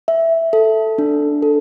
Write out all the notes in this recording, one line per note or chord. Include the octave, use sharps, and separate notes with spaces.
E5
A4
D4
A4